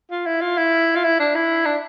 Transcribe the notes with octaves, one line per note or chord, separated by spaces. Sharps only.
F4
E4
F4
E4
F4
E4
D4
E4
D4